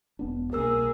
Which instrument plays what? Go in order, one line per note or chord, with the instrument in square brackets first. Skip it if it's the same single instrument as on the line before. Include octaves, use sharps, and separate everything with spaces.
[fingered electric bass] E1 B3 D4
[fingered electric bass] C2 B2 [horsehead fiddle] A#3 G#4 [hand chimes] A#4 E6